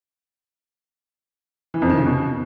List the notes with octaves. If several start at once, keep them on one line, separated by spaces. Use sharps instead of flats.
E3
F2
D#3
C#3
B2